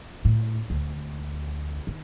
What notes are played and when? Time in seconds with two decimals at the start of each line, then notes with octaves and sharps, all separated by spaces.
0.25 A2
0.70 D2
1.87 D#3